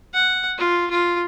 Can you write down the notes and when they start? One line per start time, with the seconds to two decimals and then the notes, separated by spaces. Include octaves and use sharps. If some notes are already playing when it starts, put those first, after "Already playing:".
0.13 F#5
0.58 F4
0.91 F4